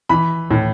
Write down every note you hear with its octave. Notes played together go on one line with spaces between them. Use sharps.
E3 B5
A2